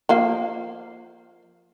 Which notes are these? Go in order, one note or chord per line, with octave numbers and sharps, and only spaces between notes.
F3 A#3 F5